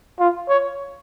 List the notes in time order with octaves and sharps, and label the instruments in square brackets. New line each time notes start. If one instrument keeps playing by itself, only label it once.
[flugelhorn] F4
C#5